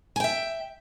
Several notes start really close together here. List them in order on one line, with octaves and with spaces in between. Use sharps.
G#5 G5 E5